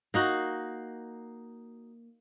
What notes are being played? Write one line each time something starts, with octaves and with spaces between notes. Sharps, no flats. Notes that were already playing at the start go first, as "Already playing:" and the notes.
A#3 D#4 F#4